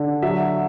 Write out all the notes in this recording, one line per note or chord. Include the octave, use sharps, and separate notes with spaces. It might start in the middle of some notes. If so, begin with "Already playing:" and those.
Already playing: D3
F#3 E5